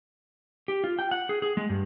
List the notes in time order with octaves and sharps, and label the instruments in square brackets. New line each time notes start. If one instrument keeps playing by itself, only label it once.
[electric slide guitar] G4
F4
G5
F#5
G#4
G#4
G#3
G2